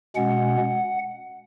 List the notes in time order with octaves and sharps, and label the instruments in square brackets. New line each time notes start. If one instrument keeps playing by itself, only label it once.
[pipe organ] B2 G#3 C#4 F#5